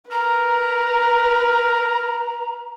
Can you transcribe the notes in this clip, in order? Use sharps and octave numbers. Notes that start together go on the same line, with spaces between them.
A#4 B4 A#5